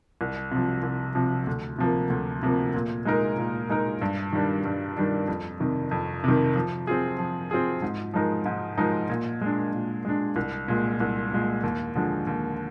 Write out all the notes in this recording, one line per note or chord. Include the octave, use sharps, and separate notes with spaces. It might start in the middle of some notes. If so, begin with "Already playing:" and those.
C2
C3 F3
C2
C3 F3
D2
C3 F3 A#3
D2
C3 F3 A#3
A#2
G#3 D#4 A#4
A#2
G#3 D#4 A#4
G2
D#3 G3 D4
G2
D#3 G3 D4
F2
C3 D#3
F2
C3 D#3
F3
C4 F4 G#4
F3
C4 F4 G#4
G#2
F3 G#3 D#4 A#4
G#2
F3 G#3 D#4 A#4
A#2
G#3 D4
A#2
G#3 D4
C2
A#2 G#3
C2
A#2 G#3
D#2
D3 F3 G#3
D#2